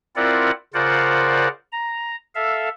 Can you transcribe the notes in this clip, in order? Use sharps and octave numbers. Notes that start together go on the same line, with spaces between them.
C4 E4 F4 A#4 D5 F#5
C#3 F4 A#4 C5 D5 F#5
A#5
A4 E5 F5